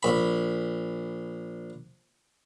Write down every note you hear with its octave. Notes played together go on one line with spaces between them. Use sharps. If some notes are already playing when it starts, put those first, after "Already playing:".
A#1 B5